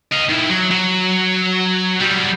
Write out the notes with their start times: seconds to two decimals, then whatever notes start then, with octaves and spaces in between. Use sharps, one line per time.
0.12 D#5 F5
0.29 D#3 E4
0.50 F#3
0.71 F#3
2.01 F#3 G3